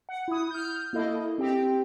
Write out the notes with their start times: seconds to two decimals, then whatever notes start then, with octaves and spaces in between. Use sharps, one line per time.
0.09 F#5
0.28 E4 D#6
0.51 F6 G6
0.93 A#3 E4 A4 D#5
1.38 C4 G4 G5